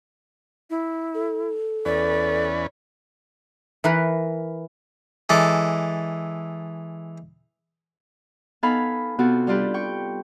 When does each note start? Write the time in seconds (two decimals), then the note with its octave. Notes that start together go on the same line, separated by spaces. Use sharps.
0.70 E4
1.14 A4
1.85 E2 C#4 B4 D5
3.84 E3 A#4 B4
5.29 E3 G#3 A4 D5
8.63 B3 D#4 A4 F5 G#5 B5
9.19 C3 B3 C4 F4 F#4 A4
9.47 G3 D4 F4 G4 B4
9.74 G5 C#6